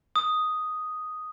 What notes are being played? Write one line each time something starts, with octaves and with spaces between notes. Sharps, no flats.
D#6